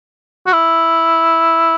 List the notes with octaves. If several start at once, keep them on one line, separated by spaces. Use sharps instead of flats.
F#4
E4